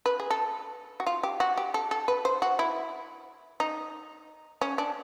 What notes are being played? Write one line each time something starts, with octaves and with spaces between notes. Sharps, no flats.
B4
G#4
A4
F#4
F4
G4
F#4
G4
A4
A4
B4
C5
F#4
E4
D#4
C#4
D4